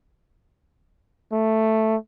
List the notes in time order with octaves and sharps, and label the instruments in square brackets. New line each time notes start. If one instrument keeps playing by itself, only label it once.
[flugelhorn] A3